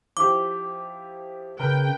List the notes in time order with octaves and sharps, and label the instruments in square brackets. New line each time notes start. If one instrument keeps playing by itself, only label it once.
[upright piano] F3 E4 G4 [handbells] D6
[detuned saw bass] C#3 [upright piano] A#4 B4 F#6 [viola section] G5